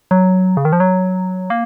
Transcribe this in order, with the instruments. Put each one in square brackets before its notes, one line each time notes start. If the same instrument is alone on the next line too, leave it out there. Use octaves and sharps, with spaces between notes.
[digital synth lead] F#3
C#3
D#3
F3
F#3
A#3